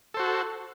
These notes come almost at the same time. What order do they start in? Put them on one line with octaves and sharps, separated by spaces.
A4 C5 F#4